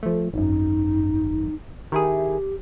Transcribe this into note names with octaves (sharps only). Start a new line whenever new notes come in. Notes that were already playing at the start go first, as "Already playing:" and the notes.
F3 A3
G#1 F#2 D#4
D#3 E4 G4 G#4